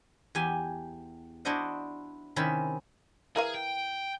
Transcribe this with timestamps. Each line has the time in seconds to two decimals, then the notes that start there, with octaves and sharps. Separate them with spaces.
0.35 E2 G4 G#5
1.45 D4 E4 F#4 C5 D#5 F#5
2.36 C3 D#3 C#4 E4 B5
3.36 E3 G#4 A#4 F5
3.54 G5